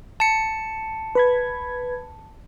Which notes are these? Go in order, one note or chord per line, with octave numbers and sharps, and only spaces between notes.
A5 C#7
B4 B5 G#6